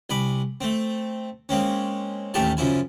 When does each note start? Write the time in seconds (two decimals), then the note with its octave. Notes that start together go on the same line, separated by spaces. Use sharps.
0.10 C2 G#5 B5 D6
0.61 A3 C4
1.49 G#3 A#3 C4 C#4
2.34 A1 D#2 A3 G4 G#5 A5
2.57 F#2 C#3 F3 E4 G#5